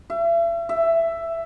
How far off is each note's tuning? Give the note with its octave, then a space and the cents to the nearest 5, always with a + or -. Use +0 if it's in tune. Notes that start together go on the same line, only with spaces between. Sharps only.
E5 +40
E5 +10